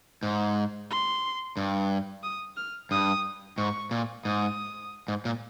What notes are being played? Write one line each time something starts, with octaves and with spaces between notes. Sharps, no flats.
G#2
C6
G2
D#6
F6
G2 D#6
G#2 C#6
A#2
G#2 D#6
G#2
A#2